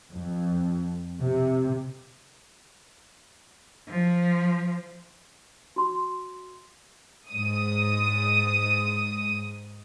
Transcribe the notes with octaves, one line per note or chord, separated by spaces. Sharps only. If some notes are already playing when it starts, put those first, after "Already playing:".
F2
C3
F3
F#4 C6
G#2 D#6